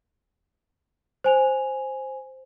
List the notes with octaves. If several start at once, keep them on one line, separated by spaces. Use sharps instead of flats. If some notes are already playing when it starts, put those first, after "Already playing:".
C5 G#5 F7